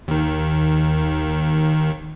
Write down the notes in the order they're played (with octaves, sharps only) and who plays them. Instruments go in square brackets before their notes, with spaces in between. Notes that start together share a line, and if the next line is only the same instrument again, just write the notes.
[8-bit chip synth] D#2 D#3